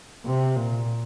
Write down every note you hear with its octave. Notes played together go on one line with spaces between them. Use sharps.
C3
A#2